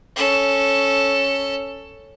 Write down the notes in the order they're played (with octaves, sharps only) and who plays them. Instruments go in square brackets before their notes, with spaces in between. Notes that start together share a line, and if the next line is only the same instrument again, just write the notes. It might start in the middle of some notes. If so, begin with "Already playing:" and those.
[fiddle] C#4 A4